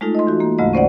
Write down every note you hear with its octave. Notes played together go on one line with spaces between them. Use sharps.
G#3 A3 D#4 F4 A4
D#5 C6
E3 F#4
A#3
D2 G#2 C#3 G#3 A3 D#5
C#4 C5 D5 F#5